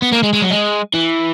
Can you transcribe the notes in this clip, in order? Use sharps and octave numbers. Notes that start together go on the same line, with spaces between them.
B3
A#3
G#3
G#3
F#3
G#3
E3